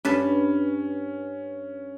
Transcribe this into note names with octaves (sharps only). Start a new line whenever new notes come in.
G2 C#4 B4 A5